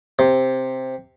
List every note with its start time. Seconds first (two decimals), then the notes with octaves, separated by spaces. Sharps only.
0.19 C3